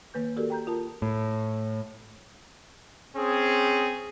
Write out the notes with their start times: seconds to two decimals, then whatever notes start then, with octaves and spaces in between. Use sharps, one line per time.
0.14 D#3 A#3 B4 G6
0.36 F#4 G4 A4 A#4 D5
0.50 G5 A#5 G6
0.67 F4 A#4 A5
1.02 A2
3.17 C4 C#4 G#4